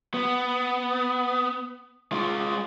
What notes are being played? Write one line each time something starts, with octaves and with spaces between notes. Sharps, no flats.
B3
G#3 F4